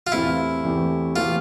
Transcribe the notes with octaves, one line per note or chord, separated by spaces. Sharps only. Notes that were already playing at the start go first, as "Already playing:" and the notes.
F4
E2 E3 A3 C4 E4 G4
E2 E3 A3 C4 G4
E3 A3 C4 F4 G4